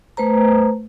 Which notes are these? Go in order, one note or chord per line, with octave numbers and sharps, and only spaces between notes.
A3 B4 C5 A#5